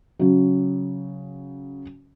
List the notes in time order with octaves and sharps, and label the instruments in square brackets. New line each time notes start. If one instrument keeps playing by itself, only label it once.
[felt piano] C#3 F#3